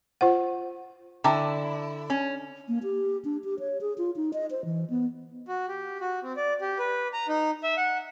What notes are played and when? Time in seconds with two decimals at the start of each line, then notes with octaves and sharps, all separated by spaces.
0.21 F4 C5 F#5
1.24 D3 E4 G5 A5 A#5
2.10 C#4
2.68 A#3
2.83 G4
3.25 D4
3.44 G4
3.59 C#5
3.81 G#4
3.98 F4
4.16 D#4
4.33 D#5
4.51 C5
4.65 E3
4.90 B3
5.48 F#4
5.68 G4
6.01 F#4
6.23 C4
6.37 D5
6.61 G4
6.79 B4
7.13 A#5
7.28 D#4
7.63 E5
7.77 F#5